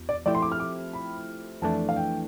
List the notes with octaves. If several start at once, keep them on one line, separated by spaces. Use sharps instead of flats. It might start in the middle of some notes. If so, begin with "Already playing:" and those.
Already playing: E2 B2
D5
F3 A3 C4 E4 G4 D5
C6
D6
F6
D6
B5
F2 E3 A3 D4 A5
F5
G5